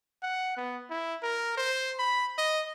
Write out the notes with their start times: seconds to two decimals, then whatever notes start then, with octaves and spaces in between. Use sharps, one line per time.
0.23 F#5
0.57 B3
0.90 E4
1.22 A#4
1.57 C5
1.99 B5
2.38 D#5